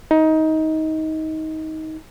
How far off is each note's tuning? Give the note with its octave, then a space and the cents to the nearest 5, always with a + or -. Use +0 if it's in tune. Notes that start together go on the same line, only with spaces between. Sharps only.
D#4 +20